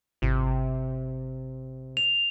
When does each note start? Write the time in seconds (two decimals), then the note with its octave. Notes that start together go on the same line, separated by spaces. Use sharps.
0.22 G#1 C3
1.97 F7